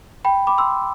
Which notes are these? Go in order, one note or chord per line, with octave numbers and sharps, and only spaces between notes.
G5 B5
B5 D6
C6 E6